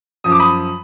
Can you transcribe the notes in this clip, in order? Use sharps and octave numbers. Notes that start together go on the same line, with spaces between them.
F#2 F3 D#6
D6
B5 D#6